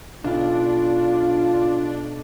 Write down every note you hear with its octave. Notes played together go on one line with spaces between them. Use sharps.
B1 D4 F4 F5